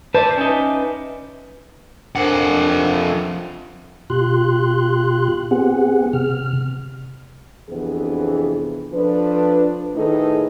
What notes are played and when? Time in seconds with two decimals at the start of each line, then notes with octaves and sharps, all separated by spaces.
0.15 B4 C5 D5 E5 A5
0.38 C#4 D#4
2.15 F2 D4 A#4 C5 F#5
4.10 B2 F4 G4 C6 F#6
5.51 B3 C4 G4 G#4 F#5
6.13 C3 F6
7.69 F2 C3 E3 B3 D4 G#4
8.93 F3 D4 A4 B4
9.95 A2 D#3 D#4 G#4 A4 B4